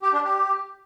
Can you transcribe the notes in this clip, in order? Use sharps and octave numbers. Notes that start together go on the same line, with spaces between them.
G4
D4
G4